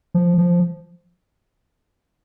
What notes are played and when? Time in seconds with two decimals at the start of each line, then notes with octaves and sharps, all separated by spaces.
0.14 F3
0.38 F3